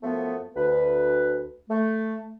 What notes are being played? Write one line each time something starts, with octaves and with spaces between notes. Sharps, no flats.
F#2 F3 A3 B3
D2 B4
A3